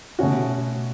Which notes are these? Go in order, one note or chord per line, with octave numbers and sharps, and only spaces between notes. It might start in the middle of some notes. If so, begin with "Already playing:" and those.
B2 A3 C#4 F#4